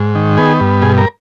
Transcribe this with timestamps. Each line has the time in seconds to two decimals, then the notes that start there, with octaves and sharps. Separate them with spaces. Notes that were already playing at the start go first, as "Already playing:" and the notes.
Already playing: G#2
0.15 D#3
0.37 B3 G#4
0.60 G2
0.82 B2 G#4
0.98 A#4